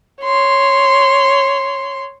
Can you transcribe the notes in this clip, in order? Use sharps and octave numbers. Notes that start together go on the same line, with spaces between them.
C#5 C6